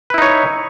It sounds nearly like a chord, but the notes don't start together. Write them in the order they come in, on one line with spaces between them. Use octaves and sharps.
B4 E4 D#4 C#5